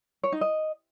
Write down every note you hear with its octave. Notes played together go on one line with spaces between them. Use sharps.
C#5
D#4
D#5